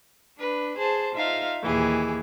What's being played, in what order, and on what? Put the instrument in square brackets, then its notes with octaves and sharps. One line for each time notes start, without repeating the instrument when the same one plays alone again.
[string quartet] D4 B4
G#4 C5 A5
D#4 F4 E5 F5
D#2 A#2 E3 G4 G#4